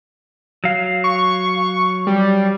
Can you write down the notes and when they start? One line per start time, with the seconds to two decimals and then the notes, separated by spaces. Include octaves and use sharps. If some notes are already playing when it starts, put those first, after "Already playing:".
0.64 F#3 F5
1.04 C#6
2.07 G3